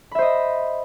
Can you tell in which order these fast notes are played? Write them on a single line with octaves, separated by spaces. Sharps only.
B5 E5 C5 D#5